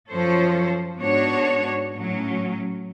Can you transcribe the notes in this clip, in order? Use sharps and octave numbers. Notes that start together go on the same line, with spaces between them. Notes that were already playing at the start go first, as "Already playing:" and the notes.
F#2 F3 A4 C5 C#5
G#2 B3 D4 F#4 C#5
A2 F#3 C#4